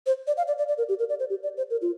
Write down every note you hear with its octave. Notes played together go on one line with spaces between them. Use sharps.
C5
D5
F5
D5
D5
D5
A#4
G4
A#4
D5
C5
G4
D5
C5
A#4
F4